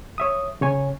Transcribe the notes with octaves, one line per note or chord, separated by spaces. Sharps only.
C#5 E5 D#6
C#3 C#5 G#5